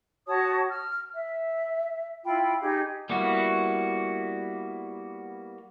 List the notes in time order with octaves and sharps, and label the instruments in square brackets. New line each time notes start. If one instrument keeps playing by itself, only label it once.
[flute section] F#4 C#5 A5 D#6
F6
E5
E4 F4 G5 B5
D#4 G4 G#4
[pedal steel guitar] G3 A#3 B3 E4 F#4